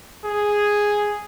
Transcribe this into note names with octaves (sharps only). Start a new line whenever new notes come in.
G#4